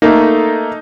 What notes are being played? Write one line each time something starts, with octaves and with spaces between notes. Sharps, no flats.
A3 A#3 D#4 A4